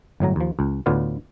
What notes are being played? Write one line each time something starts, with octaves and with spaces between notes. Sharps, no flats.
G1 A2 F#3 A#5
D#2 F3
C#2
D2 A2 B3 F4 D5 F5